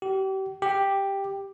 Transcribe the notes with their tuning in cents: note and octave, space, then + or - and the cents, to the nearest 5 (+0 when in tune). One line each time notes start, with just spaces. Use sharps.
G4 -35
G4 +5